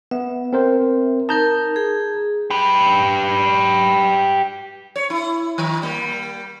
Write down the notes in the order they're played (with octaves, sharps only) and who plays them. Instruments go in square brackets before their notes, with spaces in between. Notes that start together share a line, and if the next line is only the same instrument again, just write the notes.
[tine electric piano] B3 [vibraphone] E5
[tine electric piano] C4 A#4 C5
[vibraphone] D#4 A#4 [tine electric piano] A5 A#5 G6
[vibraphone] G#4
[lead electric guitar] G4 B4
[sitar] C#5
E4
D#3
G3 A#3